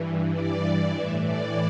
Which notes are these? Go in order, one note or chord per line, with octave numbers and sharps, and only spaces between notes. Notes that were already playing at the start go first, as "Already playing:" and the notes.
Already playing: G2 E3
D5
A2 E3 E5
D5